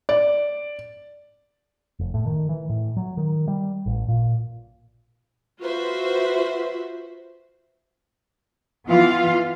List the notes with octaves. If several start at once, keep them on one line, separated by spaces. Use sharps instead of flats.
D5
F1
A2
D#3
E3
A2
F#3
D#3
G3
A1
A#2
F4 F#4 B4 C5 E5
E3 B3 F4 F5